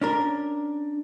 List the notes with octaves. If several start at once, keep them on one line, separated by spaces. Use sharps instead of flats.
C#4 D4 A#4